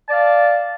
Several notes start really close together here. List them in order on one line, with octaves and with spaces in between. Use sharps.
A5 D5 F5